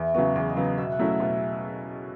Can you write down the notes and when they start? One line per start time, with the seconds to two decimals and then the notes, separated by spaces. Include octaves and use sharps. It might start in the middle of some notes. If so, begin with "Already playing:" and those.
Already playing: E2 E4
0.14 C#3 F#3 B3 F#4
0.35 E2 G#4
0.49 D#5
0.56 C#3 F#3 B3
0.64 D#5
0.78 B2 E5
0.92 F#5
0.99 F#3 A3 C#4 E4
1.06 E5
1.20 B2